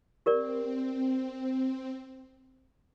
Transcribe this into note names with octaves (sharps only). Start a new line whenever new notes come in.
C4 G4 A#4 D5